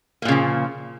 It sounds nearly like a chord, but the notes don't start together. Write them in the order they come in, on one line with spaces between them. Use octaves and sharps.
A#3 A#2 C#3 F3